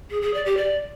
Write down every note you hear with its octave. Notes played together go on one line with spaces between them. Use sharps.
G#4
G#4
D5
G4
D5